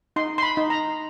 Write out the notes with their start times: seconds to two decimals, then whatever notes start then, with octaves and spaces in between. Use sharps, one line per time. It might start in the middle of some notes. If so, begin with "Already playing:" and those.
0.16 D#4 C6
0.38 C6
0.43 B5
0.57 D#4
0.70 A#5